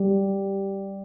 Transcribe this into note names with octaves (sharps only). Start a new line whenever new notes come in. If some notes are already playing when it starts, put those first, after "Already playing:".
Already playing: G3